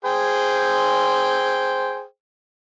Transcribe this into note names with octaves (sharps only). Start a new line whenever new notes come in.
G#4 C5 G5